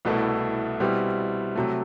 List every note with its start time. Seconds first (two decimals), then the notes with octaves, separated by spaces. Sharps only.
0.05 C2 B2 A3 E4 A4
0.80 B2 G3 C4 E4 G4
1.55 C3 F#3 A3